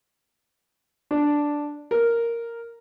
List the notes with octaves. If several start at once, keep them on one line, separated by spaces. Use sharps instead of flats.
D4
A#4